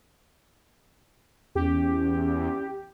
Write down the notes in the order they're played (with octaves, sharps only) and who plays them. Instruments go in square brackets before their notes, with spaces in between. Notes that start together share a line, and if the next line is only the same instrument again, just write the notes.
[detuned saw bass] E2 [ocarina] C#4 [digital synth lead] G4